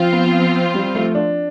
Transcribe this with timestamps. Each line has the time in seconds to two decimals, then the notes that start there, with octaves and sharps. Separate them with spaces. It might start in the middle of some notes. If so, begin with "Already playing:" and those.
Already playing: F3 C4 F4
0.13 B3
0.74 G3
0.95 A3
1.15 D4